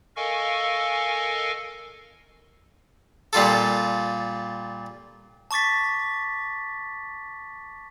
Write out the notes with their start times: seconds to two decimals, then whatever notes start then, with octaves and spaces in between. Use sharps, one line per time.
0.16 A4 A#4 D#5 F5 G#5 C#6
3.33 A#2 G3 F4 A4
5.51 A5 C#6 D6 A6 B6